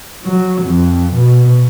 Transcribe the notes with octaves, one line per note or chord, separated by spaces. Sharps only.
F#3
F2
B2